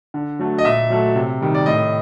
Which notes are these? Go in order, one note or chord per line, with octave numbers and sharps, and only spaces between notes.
D3
F#3 A3
D#5
A#2 E5
F#3 A3
C3
D#3 G3
D5
A2 D#5